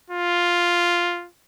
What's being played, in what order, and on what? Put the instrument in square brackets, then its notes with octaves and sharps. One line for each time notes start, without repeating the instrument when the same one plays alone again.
[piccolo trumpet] F4